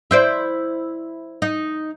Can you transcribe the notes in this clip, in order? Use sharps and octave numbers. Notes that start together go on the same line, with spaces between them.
E4 C5 D5
D#4